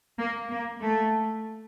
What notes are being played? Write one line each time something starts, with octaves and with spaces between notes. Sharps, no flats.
A#3
A#3
A3